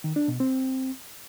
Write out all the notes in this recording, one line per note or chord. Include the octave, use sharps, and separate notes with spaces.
D#3
D4
B2
C4